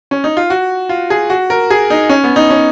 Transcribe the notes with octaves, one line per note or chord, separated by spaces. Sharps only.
C#4
D#4
F4
F#4
F4
G#4
F#4
A#4
G#4
D#4
C#4
B3
D#4
C#4